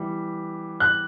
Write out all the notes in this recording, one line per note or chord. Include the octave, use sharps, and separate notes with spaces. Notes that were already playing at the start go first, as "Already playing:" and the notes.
Already playing: E3 G3 B3
F#6